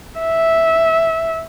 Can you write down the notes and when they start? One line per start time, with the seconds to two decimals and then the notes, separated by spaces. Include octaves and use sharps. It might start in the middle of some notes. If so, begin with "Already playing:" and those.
0.19 E5